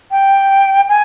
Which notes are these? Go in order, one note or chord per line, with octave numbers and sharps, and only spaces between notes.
G5
G#5